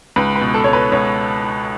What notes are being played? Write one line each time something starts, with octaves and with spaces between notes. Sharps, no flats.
C#2 B4
B4
B2
A4
C#2 C#5
B4
C#2 C#5